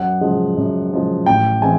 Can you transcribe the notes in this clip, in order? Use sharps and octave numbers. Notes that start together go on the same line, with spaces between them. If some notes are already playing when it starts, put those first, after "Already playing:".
Already playing: F#2 F#5
C#3 F3 G#3
F#2
C#3 F3 G#3
A1 G5
E3 G#3 C4 G#5